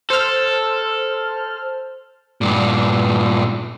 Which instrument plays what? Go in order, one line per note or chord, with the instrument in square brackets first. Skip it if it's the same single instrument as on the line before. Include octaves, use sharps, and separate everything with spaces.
[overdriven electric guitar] A4 [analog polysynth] C5 F6
[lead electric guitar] G2 A#2